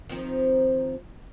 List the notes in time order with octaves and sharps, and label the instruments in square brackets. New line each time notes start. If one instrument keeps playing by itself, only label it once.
[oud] D#3 F3 C4